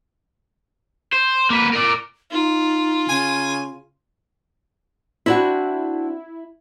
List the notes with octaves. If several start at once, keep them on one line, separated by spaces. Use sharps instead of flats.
C5
A#3 B4
A#4 D5
D#4 F4
C#3 G#5
C4 D4 E4 F#4